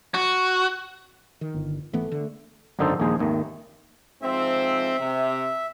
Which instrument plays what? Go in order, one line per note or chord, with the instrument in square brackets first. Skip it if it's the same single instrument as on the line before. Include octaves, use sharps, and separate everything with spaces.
[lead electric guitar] F#4
[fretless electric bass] D#3
[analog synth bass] G1
[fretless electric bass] G#1 E3 B3 [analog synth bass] A3
[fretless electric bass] D3
[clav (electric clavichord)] G#1 F#2 D3 D#4 A4 C5
A#1 D#2 G#3 D#4 G#4 C5
G#1 D#2 D#3 A3
[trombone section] G#2 F3 C4 [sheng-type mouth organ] E5
[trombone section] C3